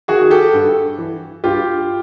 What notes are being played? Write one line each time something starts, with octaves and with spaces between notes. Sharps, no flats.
D#3 F#4 G#4
G4 A4
G2
E3
G2 F4 G4